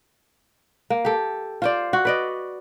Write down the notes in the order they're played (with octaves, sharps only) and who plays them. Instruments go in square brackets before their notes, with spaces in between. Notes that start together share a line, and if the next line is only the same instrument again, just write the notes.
[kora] A#3
G4 A4
F4 C5 D5
F#4
B4 D5 D#5